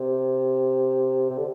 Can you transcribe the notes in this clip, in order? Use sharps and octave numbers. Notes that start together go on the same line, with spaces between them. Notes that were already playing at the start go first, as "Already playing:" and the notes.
Already playing: C3
C3
D3